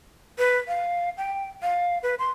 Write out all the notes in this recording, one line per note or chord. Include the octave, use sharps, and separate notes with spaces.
B4
F5
G5
F5
B4
C6